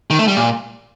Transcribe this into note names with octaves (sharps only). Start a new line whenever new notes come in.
D#3
A3
G3
A#2